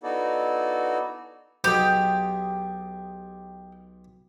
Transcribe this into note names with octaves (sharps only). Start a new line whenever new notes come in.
B3 D#4 E4 F#4 A4 D5
B1 G4 G#4